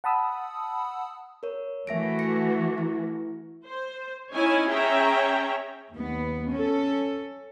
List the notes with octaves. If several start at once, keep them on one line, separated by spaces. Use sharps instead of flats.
F#5 A5 B5 D#6 E6
A#4 C#5
E3 A3 F#4 E5 A#6 D7
A#6 C#7
E4
C5
C#4 D#4 E4 C#5 G#5
C#4 G#4 C#5 E5 G5 A#5
D#2 B3
C#4 A4